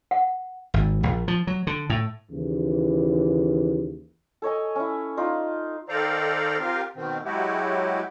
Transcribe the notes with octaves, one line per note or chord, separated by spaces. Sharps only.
F#5
G#1
A#1
F3
F#3
D3
A2
D#2 C#3 E3
A4 C#5 D#5 G#5
C#4 E4
D#4 F4 D5
D#3 A4 C5 D5 F5 A#5
C4 F4 G4 A#4 F5
B2 D#3 C4
F#3 G#3 E4 F#4 G4